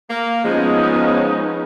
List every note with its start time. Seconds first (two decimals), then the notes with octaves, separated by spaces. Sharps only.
0.10 A#3
0.44 F3 G#3 B3 C#4 D#4